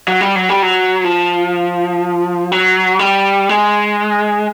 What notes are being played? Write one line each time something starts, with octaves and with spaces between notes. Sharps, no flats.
F#3
G3
F#3
G3
F#3
F3
F#3
G3
G#3